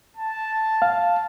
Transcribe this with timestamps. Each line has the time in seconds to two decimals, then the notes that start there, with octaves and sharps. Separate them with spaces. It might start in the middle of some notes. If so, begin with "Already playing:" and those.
0.17 A5
0.82 F5